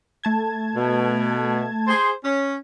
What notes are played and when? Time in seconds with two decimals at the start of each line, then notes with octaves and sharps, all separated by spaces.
0.24 A3 A5 G#6
0.76 B2
1.88 G#4 C5
2.25 C#4